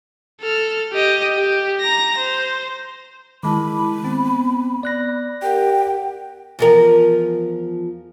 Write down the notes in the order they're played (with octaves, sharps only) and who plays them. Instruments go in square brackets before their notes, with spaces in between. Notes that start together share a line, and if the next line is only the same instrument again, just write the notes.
[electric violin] A4 F6
G4 D#5
G4
A#5 A#6
C5
[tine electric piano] D#3 G#3 [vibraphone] E4 A5 D6 [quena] B5
[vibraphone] B3 [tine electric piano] C4
[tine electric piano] D5 F#6 A#6
[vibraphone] G4 A#4 F#5 [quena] G5
[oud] E2 F3 A#4